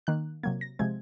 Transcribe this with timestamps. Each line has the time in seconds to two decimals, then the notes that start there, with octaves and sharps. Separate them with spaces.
0.07 D#3 A#3 F#6
0.43 C3 F#3 A#3 G#6
0.61 A#6
0.79 C3 F3 G#3 C4 G#6